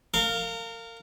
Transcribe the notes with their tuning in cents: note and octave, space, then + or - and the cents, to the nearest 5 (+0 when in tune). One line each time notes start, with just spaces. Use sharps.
A#4 -35 F5 +0